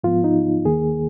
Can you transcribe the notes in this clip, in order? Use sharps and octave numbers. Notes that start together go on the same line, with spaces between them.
G#2 F3 B3 F4
D#4
D#2 D#3 A#3 G#4